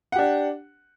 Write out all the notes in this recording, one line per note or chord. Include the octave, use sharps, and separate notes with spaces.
D4 G4 F#5